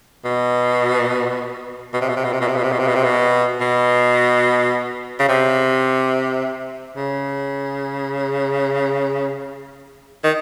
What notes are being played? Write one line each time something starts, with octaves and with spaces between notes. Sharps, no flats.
B2
B2
C3
B2
C3
B2
C3
B2
C3
B2
C3
B2
C3
B2
C3
B2
B2
C#3
C3
C#3
D#3